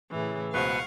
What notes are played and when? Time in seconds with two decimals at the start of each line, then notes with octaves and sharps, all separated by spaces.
0.12 A2 C#3 E3
0.54 C#2 B2 B4 C5 F5 F#5 C#6